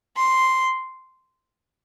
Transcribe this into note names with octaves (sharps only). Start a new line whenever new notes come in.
C6